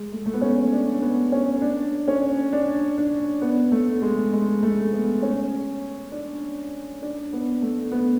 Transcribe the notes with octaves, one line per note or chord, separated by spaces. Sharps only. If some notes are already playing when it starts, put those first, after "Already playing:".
Already playing: G#3
A3
A3
B3
C#4
D4
B3
C#4
D4
C#4
D4
D4
B3
A3
G#3
G#3
A3
B3
C#4
D4
D4
B3
A3
B3